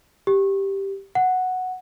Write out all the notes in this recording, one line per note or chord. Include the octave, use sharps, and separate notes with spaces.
G4
F#5